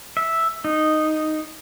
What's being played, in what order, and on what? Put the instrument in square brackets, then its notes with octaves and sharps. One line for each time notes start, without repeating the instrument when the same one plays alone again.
[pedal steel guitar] E5
D#4